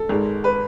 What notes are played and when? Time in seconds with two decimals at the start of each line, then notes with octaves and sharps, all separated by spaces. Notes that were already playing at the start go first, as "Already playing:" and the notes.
Already playing: A4
0.09 G#1 G#2 G#3
0.44 B4